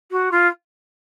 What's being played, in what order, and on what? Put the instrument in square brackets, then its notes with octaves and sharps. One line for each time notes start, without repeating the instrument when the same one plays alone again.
[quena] F#4
F4